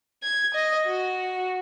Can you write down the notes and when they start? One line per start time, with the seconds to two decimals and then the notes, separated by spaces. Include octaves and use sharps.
0.22 G#6
0.54 D#5
0.87 F#4